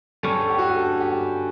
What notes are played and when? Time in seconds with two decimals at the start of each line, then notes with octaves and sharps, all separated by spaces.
0.23 G2 D3 G3 C#4 A4
0.40 A4
0.49 G4
0.58 F#4
0.66 G4
0.75 A4
1.01 G4